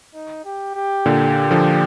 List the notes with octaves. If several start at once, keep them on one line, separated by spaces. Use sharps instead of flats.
D#4
G4
G4
A#2 D3
D3 F3